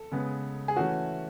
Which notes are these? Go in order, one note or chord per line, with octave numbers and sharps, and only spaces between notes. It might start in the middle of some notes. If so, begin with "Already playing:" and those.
Already playing: A4
C#3 G#3 B3
G#4
E3 A3 C#4 F#4